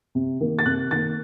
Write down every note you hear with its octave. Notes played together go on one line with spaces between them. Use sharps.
C3
D#3 A#3
A6
C3 F#6
D#3 A#3 A6